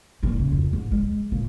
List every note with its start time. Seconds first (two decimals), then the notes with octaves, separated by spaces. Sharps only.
0.23 A#2 E3
0.39 C#3
0.52 F2
0.73 G#2
0.91 G#3
1.31 A#2 D3